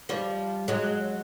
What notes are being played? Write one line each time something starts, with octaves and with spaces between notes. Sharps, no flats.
F3 G3
F#3 G#3